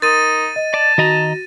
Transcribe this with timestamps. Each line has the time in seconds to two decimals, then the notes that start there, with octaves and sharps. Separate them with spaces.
0.02 D#4 A#4 C6 D#6 A6 D#7
0.56 D#5
0.74 D5 A5
0.98 D#3 F#4 D#5 A#5 A#6 E7